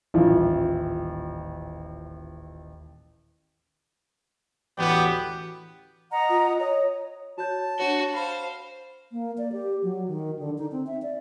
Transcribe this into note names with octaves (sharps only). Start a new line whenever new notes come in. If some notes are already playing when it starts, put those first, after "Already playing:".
D#1 A1 E4 F4
A1 D2 B3 G4
D#5 F#5 A#5
F4
C#5 D#5
F#4 C#5 A5 G6
D4 F#4 C#5 G7
C5 F5 B5
A#3
D5
G4
F#3
D#3
D3
D#4
C4
E5
D5